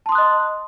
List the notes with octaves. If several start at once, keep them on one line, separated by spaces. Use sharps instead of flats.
D#5 A5 C6 D#6 F#6